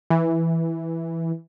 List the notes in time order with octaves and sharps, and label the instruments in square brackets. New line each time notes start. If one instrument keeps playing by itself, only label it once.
[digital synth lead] E3